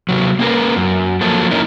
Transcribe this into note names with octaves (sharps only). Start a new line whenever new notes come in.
C3 F#3
A#3 C#4 G4 A#4 B4
F#2
F3 F#3 A#3 A4
A#3 C#4 D#4 E4 A#4